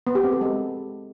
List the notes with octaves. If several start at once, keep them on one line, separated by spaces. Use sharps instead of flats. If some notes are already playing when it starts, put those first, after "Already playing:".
B3
G4
C4
A4
G#3